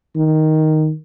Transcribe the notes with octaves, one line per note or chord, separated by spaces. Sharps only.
D#3